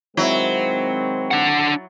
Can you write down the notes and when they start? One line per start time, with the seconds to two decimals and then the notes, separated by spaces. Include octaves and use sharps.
0.17 D#3 F#3 G#3 C4 E4
1.31 D4 F#5